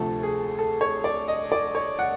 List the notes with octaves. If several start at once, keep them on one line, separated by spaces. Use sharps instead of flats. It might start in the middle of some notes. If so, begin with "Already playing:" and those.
Already playing: D2 C3 F3 A3 A4
G#4
A4
C#5
D5
D#5
D5
C#5
F#5